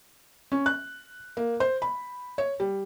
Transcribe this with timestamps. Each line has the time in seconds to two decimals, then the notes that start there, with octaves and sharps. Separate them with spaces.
0.52 C#4
0.66 F#6
1.37 A#3
1.60 C5
1.82 B5
2.38 C#5
2.60 G3